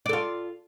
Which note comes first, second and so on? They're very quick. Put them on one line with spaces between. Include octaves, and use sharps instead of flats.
D5 A4 F4